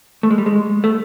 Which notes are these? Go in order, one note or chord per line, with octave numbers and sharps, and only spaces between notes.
A3
G#3
G3
G#3
A3